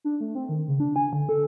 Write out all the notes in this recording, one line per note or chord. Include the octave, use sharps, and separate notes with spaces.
D4
A3
C4
D#3
C#3
D4
G#5
D3
A4